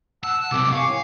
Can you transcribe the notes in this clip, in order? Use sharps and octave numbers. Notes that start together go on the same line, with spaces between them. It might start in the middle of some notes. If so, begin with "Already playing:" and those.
F#5 A5 E6
B1 C3 D#3 G4 D6
F5 G#5 C#6
A2